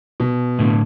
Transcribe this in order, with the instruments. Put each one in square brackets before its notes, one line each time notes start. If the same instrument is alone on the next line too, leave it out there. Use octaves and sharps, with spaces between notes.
[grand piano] B2
[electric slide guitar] A2 D3